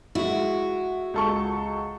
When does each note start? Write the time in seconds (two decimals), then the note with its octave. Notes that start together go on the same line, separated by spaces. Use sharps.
0.15 G#3 E4 F#4
1.14 C#2 A4 C#6